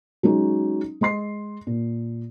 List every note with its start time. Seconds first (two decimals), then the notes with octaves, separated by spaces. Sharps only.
0.23 F#3 G#3 C#4 D#4
1.01 G#3 D#5 C6 C7
1.67 A#2